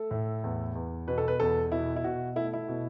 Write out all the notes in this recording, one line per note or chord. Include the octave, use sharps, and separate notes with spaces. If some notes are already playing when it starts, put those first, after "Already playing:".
Already playing: A3 A4
A2
E2
E2
B2 B4
A4
B4
E2 A4
B2 E4
E4
B2 F#4
A3 E4
E4
B2